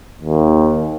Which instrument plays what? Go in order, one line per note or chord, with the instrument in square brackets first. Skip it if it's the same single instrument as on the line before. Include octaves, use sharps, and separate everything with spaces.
[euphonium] D#2